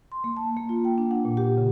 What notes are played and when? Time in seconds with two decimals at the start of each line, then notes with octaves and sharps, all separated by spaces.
0.12 C6
0.24 A#3
0.37 A5
0.57 A#3
0.69 F4
0.85 G5
0.98 D4
1.11 F#5
1.25 A#2
1.37 G4
1.58 C#3